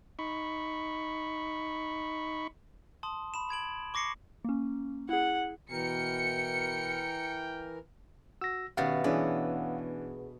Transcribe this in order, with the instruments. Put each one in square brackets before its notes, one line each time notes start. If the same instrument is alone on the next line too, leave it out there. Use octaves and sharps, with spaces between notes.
[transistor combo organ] D#4 B5 C#6
[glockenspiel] A5 C6 D#6
B5 E7
B5 G#6 D7 F#7
C#6 D6 A#6 C7 C#7
[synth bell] A#3 C#4
[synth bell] E4 G#4 [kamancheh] F#5
[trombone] B2 [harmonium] E3 A#4 [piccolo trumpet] G5 [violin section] C#7
[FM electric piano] F#4 [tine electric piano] E6 A#6
[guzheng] B2 A3 [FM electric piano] D#3 C#4 G4 [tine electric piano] F5 F#5 A6
[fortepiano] E3 C#4 D4 [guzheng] B3 [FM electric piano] G#4